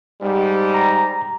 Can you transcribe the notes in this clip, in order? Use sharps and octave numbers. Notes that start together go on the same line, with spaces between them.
G#2 G3
A#5